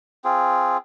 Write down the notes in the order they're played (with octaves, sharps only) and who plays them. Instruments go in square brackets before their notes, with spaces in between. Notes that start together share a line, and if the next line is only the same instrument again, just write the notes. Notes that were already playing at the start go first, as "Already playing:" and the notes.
[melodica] C4 F4 G#4